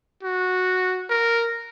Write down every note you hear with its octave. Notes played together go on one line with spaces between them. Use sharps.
F#4
A#4